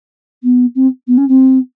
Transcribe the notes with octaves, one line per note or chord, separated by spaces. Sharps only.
B3
C4
B3
C#4
C4